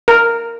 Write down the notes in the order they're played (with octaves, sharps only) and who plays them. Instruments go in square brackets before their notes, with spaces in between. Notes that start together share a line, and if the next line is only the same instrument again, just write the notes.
[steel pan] A#4